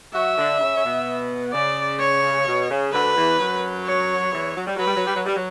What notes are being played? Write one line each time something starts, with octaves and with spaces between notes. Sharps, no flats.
F#3 F#4 E5
D3 D4
C#3 C#4
C#4
B2 B3
C#3 D5
C#5
B2
C#3
D2 D3 B4
E2 E3
F#2 F#3
C#5
E2 E3
F#3
G3
F#3 B4
G3
F#3
G3
F#3
G3
F#3